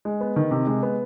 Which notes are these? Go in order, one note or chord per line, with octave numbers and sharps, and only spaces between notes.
G#3
B3
D#3
C3
G#3
B3